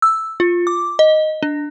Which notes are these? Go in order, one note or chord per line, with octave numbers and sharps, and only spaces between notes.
E6
F4
D6
D#5
D4